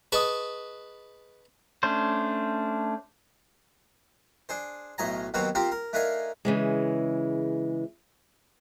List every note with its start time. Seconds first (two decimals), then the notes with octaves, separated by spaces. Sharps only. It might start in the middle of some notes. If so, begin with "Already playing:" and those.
0.12 G#4 B4 D#5 A5 C#6 D#6
1.83 A3 C#4 D4 C5
4.49 D4 G#4 C5
4.98 B1 A2 D#5 G#5 A#5
5.34 D#2 B2 F#3 C4 F#4 C#5
5.55 C4 F4 G4 A#4
5.72 A#4
5.93 A3 D4 D#4 A#4 F5 G#5
6.45 C#3 E3 G#3